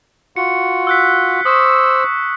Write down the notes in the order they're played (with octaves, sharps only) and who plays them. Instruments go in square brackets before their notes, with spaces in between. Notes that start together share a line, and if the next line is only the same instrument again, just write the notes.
[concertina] F4 F#4 [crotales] C#7
[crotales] E6 F#6 B6
[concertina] C5 E6 [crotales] C#6 D#6